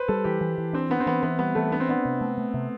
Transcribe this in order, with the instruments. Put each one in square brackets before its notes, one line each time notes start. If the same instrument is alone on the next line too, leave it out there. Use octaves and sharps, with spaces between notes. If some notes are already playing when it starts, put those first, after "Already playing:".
Already playing: [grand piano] B4 C5
[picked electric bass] G3 [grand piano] A4
[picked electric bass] E3 [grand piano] G4
[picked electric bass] E3
E3
[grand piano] C4 [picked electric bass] D4
[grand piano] B3 [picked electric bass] D4
[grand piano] C4
[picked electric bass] E3 [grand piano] B3
[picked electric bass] E3 [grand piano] B3
[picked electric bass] G3 [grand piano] B3
[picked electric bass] E3 [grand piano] A3
[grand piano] B3 [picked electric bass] D4
[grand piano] C4
[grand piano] B3 [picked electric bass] D4
[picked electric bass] C3
A3
A3
C3